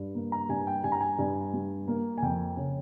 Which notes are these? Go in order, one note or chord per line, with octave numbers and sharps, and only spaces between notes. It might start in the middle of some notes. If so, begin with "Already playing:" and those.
Already playing: G2
A#3
A#5
G2 G#5
G5
G2 G#5
A#5
G#5
G2
G3
A#3
G#5
F2 G5
C#3